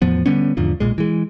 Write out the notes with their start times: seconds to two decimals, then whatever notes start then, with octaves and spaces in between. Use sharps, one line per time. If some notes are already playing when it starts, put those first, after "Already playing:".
0.02 E2 A2 F3 B3
0.26 D3 G3 B3 C#4
0.57 E2 G#2 D3 F3
0.80 B1 A#2 G#3
0.98 E3 G#3